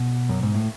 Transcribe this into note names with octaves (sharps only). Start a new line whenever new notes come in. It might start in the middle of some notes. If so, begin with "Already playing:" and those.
Already playing: B2
F#2
G#2
A2